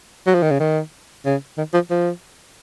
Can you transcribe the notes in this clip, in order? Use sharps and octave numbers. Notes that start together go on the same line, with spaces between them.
F#3
F3
D#3
C#3
D#3
C#3
D#3
F3
F3